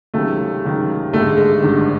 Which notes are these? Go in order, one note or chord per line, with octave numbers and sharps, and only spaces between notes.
C#2 C3 D#3 F#3 A3
C#2 C3 D#3 F#3
G#1 G2 D3 A3
G#3
G#3
G#1 G2 D3